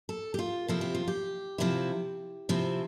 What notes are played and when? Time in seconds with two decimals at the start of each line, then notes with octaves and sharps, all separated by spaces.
0.09 A4
0.34 G4
0.39 F4
0.68 C3 F3 C4 E4 A4
0.81 G4
0.95 F4
1.08 G4
1.58 C3 F3 C4 E4
2.49 C3 F3 C4 E4